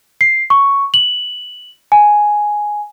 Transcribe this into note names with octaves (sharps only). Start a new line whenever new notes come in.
C7
C#6
F#7
G#5